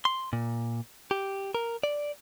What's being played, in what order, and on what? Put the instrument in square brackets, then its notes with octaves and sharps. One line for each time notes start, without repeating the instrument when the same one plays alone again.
[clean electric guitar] C6
A#2
G4
A#4
D5